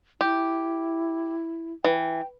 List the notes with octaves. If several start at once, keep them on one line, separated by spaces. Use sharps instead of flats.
E4 G4
E3 G5